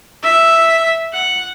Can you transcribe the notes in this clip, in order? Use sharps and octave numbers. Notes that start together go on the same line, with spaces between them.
E5
F#5